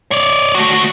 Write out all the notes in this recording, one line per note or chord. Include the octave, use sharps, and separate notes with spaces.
C#5 D5
A3 F#4